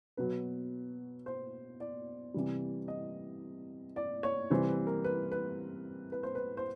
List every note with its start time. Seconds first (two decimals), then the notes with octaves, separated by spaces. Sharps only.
0.17 B2 F#3 B4
1.26 C5
1.80 D5
2.34 C3 E3 G3
2.88 D#5
3.96 D5
4.23 C#5
4.50 C3 E3 G3 C5
4.68 B4
4.87 A#4
5.04 B4
5.32 B4
6.12 B4
6.23 C5
6.35 B4
6.57 C5